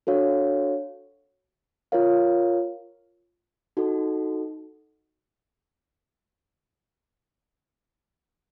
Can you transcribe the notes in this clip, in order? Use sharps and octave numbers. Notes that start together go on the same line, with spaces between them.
D4 F#4 A4 C#5 F5
F4 A#4 C#5 F5
D#4 F#4 A4